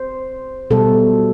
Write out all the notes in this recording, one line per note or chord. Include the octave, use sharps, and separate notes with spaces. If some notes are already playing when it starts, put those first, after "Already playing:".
Already playing: C5
B2 G3 A4